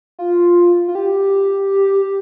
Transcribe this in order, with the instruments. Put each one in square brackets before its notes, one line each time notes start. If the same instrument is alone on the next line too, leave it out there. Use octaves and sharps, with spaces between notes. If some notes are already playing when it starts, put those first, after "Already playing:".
[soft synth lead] F4
F4
G4